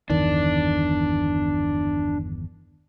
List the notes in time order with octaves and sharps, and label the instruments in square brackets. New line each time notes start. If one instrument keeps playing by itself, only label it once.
[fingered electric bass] G1 E2 D#3 [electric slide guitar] D4